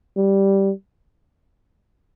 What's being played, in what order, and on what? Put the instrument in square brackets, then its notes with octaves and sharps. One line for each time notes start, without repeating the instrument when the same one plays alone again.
[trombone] G3